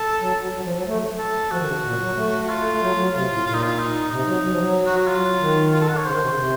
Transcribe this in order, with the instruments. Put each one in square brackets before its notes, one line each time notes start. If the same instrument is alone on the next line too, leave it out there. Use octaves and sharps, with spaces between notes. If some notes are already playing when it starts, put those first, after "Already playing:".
Already playing: [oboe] A4
[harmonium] F#3
F#3
F#3
F3
F#3
A3
[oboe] A4
[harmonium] F3 [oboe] F#4
[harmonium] D#3
C#3
A#2
F#3
A3
[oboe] F#4
F4
[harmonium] A3
F#3
F#3
[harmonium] C3 [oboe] F4
[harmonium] A2
[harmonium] A#2 [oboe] F4
[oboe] D#4
F4
D#4
[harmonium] C3 [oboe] D#4
[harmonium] F#3
F#3
F3
F#3
[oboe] F#4
F#4
F4
[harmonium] D#3
[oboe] F4
A4
F#5
C#5
[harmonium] C#3 [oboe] C5
[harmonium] D#3
C3
C#3
C3